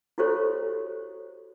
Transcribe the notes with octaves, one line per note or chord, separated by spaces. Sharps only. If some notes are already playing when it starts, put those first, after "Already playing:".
E4 F#4 G4 A4 C5 C#5